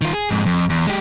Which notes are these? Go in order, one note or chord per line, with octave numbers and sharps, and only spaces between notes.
D#3 F4
G#4
F2 G#2
F2
E2
G#3 G4